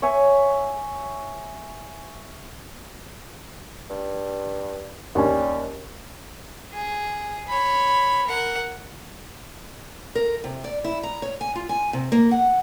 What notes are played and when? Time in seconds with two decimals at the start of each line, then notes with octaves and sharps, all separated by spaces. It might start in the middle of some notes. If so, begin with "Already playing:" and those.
0.02 C#5 E5 G#5 C#6
3.90 G2
5.15 D#2 G3 C#4
6.73 G#4
7.47 C#5 B5
8.27 A#4 F#5
10.15 A#4
10.44 C3
10.64 D5
10.84 E4
11.03 A#5
11.22 C#5
11.41 G#5
11.55 F4
11.69 G#5
11.93 C3
12.12 A#3
12.31 F#5